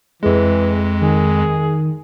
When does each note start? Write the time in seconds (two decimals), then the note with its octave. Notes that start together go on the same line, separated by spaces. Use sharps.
0.23 F2 E3 G#3 G#4
1.01 D#3 G#4